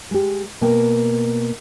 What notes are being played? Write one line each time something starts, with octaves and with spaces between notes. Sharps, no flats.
G#3 G4
B2 A#3 G5